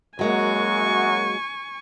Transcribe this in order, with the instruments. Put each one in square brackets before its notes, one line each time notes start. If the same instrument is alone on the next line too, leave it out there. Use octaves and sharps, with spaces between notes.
[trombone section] F#2 F#4 [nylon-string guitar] F#3 G#3 A#3 [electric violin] G#5 C#6